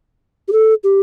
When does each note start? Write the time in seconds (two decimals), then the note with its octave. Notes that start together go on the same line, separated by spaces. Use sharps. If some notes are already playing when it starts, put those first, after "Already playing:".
0.48 G4
0.52 A4
0.84 G4